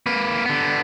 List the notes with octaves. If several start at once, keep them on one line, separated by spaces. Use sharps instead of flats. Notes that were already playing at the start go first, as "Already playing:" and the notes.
A#3 B4
D3 B3